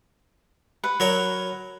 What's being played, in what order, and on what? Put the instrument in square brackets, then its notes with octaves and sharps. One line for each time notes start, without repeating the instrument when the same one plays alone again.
[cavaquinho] B4 F#5
[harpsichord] F#3 A#4 C#5